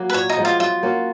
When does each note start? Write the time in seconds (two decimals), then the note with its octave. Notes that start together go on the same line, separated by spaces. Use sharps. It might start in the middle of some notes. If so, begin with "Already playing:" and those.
Already playing: F#3 A#3
0.10 B4
0.14 A#2 C#5
0.29 D#4
0.37 F3 G#3 B3
0.45 F4
0.59 F#3 F4
0.83 A#3 C#4 F#4